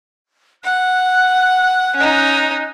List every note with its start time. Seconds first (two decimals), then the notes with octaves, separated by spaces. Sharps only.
0.64 F#5 F#6
1.96 C#4 D#4